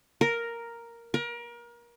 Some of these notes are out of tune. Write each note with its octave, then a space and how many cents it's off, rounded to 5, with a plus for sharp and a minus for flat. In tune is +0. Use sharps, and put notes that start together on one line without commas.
A#4 +0
A#4 +30